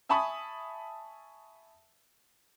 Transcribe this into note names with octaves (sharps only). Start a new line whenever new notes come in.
E5 G#5 A5 B5 C#6 D#6